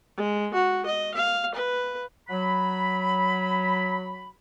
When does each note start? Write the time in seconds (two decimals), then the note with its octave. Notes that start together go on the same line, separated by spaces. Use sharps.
0.17 G#3
0.54 F#4
0.86 D#5
1.14 F5
1.54 B4
2.29 F#3 B5